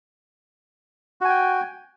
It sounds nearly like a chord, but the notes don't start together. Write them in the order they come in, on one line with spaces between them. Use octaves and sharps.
F#4 G#5 G5